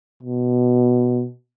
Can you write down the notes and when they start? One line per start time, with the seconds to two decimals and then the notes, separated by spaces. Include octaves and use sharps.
0.23 B2